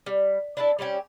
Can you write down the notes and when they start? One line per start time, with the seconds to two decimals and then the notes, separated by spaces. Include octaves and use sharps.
0.06 G3
0.57 D4 E4 A4
0.79 G3 C4 C#4 G4